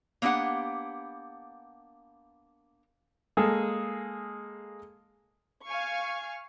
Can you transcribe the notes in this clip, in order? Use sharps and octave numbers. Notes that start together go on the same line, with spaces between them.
A#3 B3 D4 G4 F#5
G#3 A#3 G#4 A4
F5 G#5 C#6